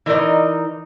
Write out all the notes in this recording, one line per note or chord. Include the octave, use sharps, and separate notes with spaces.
E3 D#4 A#4 C5 D5 D#5